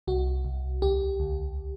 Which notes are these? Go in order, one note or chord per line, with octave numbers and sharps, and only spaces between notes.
C2 F#4
C2
D2 G4
D2